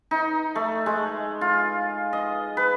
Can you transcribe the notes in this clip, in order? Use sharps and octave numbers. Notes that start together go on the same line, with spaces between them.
D#4
A3
G#3
F4
D#5
B4